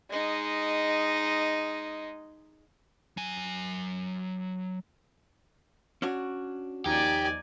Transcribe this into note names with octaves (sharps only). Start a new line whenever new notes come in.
G#3 D#4
F#3 G#5
C#4 D4 F#4
D#2 F3 D#4 G4 D5 G#5